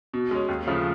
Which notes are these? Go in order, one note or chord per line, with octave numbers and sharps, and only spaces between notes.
B2
G#3 C#4
D#2
C#3 F3 A3